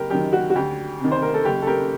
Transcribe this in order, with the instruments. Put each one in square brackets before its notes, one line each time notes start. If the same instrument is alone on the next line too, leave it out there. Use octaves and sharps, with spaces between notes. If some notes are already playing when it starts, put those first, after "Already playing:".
Already playing: [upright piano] F#1 G4 A#4
F#2 D#3 G4
F#4
F#4
D2 G4
C3 D#3
C5
A#4
A4
F#1 G4
A4
G4 A#4